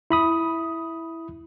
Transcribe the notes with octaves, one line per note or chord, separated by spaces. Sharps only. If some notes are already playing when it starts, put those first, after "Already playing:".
E4 B5 D#6